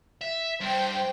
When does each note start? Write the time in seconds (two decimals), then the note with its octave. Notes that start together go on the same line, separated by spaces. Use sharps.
0.21 E5
0.60 G2 C5 G5